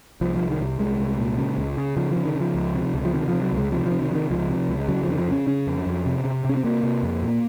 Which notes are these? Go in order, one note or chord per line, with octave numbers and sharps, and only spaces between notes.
C2 F3
C2 F3
D#3
C2
C2 G#3
C2
A#2
C#3
C#2
C#3
C#3 F3
F3
C#3
D#3
C#3
F3
C#2
C3
C#2
F3
C3 D#3
C3 F3
F#3
C#2 G#3
C3 F3
F3
C3
D#3
C3 D#3 F3
C#2 F3
C3
C#2
C#3 F#3
F3
F2 D#3
F3
C#3 C#4
C#3 C#4
F2
F2
C3
C3
C3 C#4
C4
C3 A#3
C3
F2
A#2